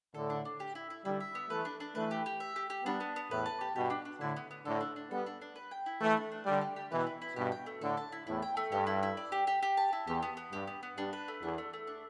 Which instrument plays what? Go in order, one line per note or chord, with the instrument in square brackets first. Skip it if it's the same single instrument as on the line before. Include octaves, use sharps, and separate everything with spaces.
[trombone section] A2 D3 [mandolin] A4
[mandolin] D4
D4
G4
E4
E4
[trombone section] D3 G3 [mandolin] E4
[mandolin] E5
B3
[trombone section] E3 A3 [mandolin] B4
[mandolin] D4
D4
[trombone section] E3 A3 [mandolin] B4
[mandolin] G4
G4
E5
G4
G4
[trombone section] G3 B3 [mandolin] D4
[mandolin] B3
B3
[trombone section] E2 A2 [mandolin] B4
[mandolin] A5
G4
[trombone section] G2 B2 [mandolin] G4
[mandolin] D4
D4
[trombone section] A2 D3 [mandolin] E4
[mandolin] B3
B3
[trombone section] A2 D3 [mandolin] A4
[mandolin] D4
D4
[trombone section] G3 B3 [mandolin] A4
[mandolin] D4
D4
B4
G5
E4
[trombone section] E3 A3 [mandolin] B4
[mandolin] D4
D4
[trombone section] D3 G3 [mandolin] D5
[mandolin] G4
G4
[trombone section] B2 E3 [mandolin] B4
[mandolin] E4
E4
[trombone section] G2 B2 [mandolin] G4
[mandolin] G5
A3
[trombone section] A2 D3 [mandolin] A4
[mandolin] A5
E4
[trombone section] E2 A2 [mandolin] E4
[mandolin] G5
A3
[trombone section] G2 [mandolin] G4
[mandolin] E4
E4
D5
G4
G4
G4
A5
E4
[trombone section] E2 [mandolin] G4
[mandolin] B3
B3
[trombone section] G2 [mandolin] G4
[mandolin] B3
B3
[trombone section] G2 [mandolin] D4
[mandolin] B4
A3
[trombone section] E2 [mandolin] D4
[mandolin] A3
A3
D4